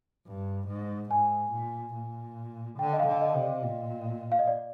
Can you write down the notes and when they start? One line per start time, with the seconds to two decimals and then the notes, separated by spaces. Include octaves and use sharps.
0.26 G2
0.68 G#2
1.10 G#2 G#5
1.52 A#2
1.94 A#2
2.79 D3 G5
2.93 D#5
3.00 F5
3.07 D3
3.21 D#5
3.35 C3
3.42 D5
3.63 A#2
4.32 F5
4.39 D#5
4.47 D5